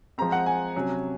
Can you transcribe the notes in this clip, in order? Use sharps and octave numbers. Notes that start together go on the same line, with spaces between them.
F3 G#3 C4 A#5
F#5
G#5
C3 F#3 C#4